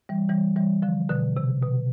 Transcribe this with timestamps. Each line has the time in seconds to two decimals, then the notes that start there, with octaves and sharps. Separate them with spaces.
0.09 E3 G3
0.29 E3 G3
0.56 E3 G3
0.82 D3 F3
1.09 B2 D3
1.37 C3
1.62 B2